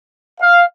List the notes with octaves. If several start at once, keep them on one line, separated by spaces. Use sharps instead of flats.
F5